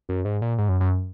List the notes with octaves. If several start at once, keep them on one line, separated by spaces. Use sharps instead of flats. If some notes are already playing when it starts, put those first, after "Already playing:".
F#2
G#2
A#2
G#2
F#2
F#2